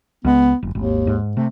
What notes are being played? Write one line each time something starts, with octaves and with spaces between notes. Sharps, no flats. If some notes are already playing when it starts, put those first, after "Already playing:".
C#2 G#3 B3
F#1
G#1 D#2
G#2
C3 A3